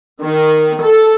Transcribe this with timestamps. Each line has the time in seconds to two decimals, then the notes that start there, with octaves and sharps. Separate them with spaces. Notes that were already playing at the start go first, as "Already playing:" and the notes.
0.22 D#3
0.82 A4